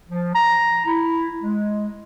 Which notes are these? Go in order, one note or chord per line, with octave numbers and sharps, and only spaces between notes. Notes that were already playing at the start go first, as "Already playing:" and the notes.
F3
A#5
E4
G#3